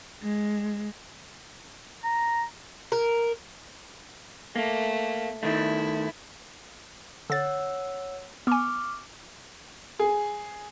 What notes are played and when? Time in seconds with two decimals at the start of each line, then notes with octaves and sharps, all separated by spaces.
0.22 G#3
2.04 A#5
2.92 A#4
4.56 A3 A#3
5.43 D#3 A3 E4
7.30 D3 C#5 F#5 E6 A6
8.47 B3 G#5 C#6 D6 F6
9.99 G#4